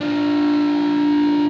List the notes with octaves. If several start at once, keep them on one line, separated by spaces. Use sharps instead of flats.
D4 F4